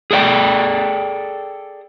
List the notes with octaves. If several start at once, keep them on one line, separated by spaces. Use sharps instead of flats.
G#4 A4 D5 E5 G5